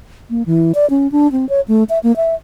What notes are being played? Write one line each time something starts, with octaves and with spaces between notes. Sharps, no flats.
A#3
E3
D5
C#4
D4
C4
C#5
A3
E5
A#3
E5